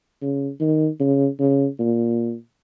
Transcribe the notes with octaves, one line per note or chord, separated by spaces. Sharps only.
C#3
D#3
C#3
C#3
A#2